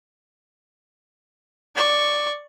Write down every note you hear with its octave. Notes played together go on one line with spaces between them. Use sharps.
D5 C#6